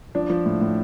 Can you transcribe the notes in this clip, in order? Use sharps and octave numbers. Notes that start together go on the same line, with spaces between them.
F3 D4
F3
A2
A2